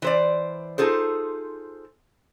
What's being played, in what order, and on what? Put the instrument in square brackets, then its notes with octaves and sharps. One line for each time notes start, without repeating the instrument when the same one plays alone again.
[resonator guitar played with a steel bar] E3 C5 D5
D#4 F4 G#4 A4 C5